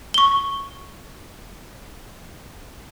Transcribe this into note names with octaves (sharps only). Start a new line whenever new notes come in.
C#6 G7